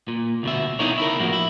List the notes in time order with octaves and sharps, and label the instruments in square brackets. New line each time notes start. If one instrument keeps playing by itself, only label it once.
[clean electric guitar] A#2
D2 B2 E5
B3 D#4 E4 A#4 C#5
E4 A#4
A2 F3 A#3 F#4
E4